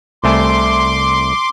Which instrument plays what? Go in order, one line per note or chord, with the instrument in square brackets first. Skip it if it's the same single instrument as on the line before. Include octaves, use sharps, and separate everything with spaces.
[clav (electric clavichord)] C2 A3 G#5 [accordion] C6 D6